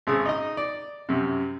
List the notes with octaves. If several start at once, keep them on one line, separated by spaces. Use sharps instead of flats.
G#1 C#3 D#6 E6
D#4 D#5
D5
F#2 C3